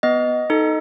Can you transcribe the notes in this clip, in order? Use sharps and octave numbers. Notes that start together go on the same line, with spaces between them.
B3 D#5
D#4 A4